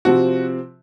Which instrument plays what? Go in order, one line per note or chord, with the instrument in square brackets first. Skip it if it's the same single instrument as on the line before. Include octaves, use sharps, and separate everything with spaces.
[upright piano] C3 F3 C4 F#4